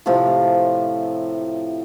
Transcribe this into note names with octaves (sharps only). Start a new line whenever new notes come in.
A2 C3 F3